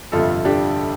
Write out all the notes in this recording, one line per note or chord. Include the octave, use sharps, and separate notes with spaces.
G1 F2 C3 F4 A4
D4 G4